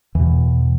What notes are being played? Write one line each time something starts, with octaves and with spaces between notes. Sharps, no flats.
E2 B2 E3